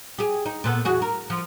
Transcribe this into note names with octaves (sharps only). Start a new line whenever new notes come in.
G4 G#4
D#4
A#2 B3 A4
E2 F#4 G#4
A#4
F3